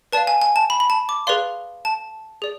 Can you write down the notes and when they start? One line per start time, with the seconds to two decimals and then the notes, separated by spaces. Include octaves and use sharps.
0.13 B4 D5 F5 A5
0.27 G#5
0.42 G#5
0.56 A5
0.70 B5
0.80 B5
0.90 A5
1.09 D6
1.27 G#4 B4 D5 F5 C6
1.85 A5
2.42 G#4 D5